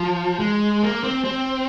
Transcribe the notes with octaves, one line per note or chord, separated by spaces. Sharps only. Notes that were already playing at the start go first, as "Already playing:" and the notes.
Already playing: F3
G#3
A#3
C4
C4